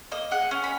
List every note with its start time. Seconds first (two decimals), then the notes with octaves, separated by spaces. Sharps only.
0.12 A#3 D#5
0.31 G#4 F#5
0.51 C#4
0.64 B5